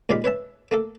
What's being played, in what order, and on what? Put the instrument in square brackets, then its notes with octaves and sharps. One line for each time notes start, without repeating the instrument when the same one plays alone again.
[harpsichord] D#2 A#2 G#3 D5 F5 B5
B4 C#5 E5 A5
A3 A#3 A4